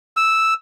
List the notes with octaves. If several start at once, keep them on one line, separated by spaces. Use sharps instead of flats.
E6